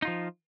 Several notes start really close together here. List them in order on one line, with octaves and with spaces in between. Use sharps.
D#4 F4 F3